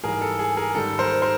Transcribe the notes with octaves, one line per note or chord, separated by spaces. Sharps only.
G#2 E3 G3 G#4 A#4
A4
G#4
G#4 A#4
G#2 D#3 G3 A4
A#4 C5
A#4 C5